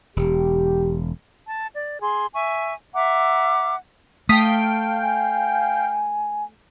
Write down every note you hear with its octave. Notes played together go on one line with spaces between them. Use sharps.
E1 G4
A5
D5
G#4 C6
E5 G#5 C#6
E5 F#5 A#5 D6
A3 F5 G5 A5 D#6 B6
G#5